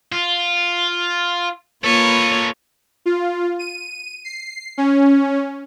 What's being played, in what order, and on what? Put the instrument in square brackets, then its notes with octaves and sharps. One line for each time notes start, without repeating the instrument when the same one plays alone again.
[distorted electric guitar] F4
[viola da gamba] A#3 F4 C#5 [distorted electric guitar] A4 B4
[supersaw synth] F4
D#7
C7
C#4